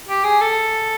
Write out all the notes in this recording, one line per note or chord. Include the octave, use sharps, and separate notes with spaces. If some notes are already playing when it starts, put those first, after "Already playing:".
G4
G#4
A4